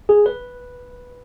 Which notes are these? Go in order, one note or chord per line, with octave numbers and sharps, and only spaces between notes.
G#4
B4